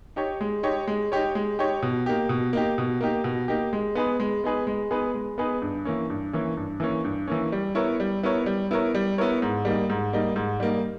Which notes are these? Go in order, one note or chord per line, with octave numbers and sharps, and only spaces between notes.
D#4 G4 C#5
G#3
D#4 G4 C#5
G#3
D#4 G4 C#5
G#3
D#4 G4 C#5
B2
A#3 D#4 G4
B2
A#3 D#4 G4
B2
A#3 D#4 G4
B2
A#3 D#4 G4
G#3
B3 D#4 G#4 B4
G#3
B3 D#4 G#4 B4
G#3
B3 D#4 G#4 B4
G#3
B3 D#4 G#4 B4
G2
E3 A#3 C#4
G2
E3 A#3 C#4
G2
E3 A#3 C#4
G2
E3 A#3 C#4
G3
B3 E4 A#4 C#5
G3
B3 E4 A#4 C#5
G3
B3 E4 A#4 C#5
G3
B3 E4 A#4 C#5
G#2
G3 A#3 D#4
G#2
G3 A#3 D#4
G#2
G3 A#3 D#4